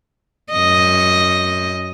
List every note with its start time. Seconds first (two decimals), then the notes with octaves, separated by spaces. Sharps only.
0.52 F#2 D#5